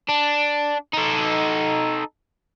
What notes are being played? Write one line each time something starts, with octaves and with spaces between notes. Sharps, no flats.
D4
D#4 A4